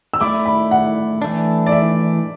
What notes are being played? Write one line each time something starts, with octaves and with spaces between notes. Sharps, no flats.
E6
A3 E4 D5 D6
B5
F#5
E3 A3 D4
D5
E5